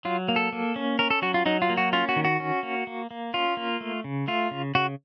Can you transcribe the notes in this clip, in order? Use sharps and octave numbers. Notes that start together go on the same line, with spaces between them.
F#3 F4
A#3
A4
A#3
C#4
C#4 A#4
A4
F#3 F#4
F4
F#3 D#4
F4
A#3
F#4
C#4 F4
F#4
D#3
F#4
C#4
A#3
A#3
A#3
C#4 F4
A#3
A3
C#3
A3 F4
C#3
C#3 F#4